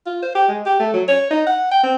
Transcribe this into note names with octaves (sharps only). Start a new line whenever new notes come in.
F4
C5
G4
G#3
G4
A3
F#3
C#5
D#4
F#5
G5
C4